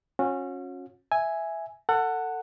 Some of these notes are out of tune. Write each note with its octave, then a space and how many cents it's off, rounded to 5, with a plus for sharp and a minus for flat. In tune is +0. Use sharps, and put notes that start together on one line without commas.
C#4 -20 F#4 -40
E5 +0 G#5 +0
A4 +30 F#5 +0